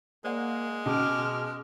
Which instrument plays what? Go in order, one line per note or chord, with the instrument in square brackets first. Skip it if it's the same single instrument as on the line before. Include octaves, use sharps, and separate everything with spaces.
[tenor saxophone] G#3 [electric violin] A#3 [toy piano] C5 D5 F#5
[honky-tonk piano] B2 [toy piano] C#4 G#4 G#5 [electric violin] D6 F6